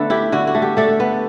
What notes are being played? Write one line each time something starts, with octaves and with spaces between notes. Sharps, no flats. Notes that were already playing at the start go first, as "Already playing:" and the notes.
Already playing: D3 A3 B3 D4 A4 B4
E4 G4
D3 F#4
F#4
A3
G4
A3 D4 A4
B3